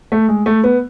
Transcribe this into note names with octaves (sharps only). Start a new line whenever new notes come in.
A3
G#3
A3
B3